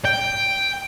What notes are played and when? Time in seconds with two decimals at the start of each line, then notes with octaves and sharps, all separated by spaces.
0.05 G5